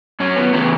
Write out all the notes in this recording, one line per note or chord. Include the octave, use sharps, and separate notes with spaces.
F#2 C#4
B3
C#3 E3 B3